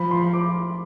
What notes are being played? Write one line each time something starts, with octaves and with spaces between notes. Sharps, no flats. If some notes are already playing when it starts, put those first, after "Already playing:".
Already playing: F3 B5
C6
D6